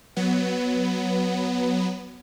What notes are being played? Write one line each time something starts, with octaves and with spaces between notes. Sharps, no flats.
F#3 B3